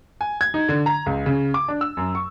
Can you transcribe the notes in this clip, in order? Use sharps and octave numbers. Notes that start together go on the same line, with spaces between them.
G#5
G#6
D#4
D3
A#5
C#2
C#3
D6
D4
E6
F#2
C#6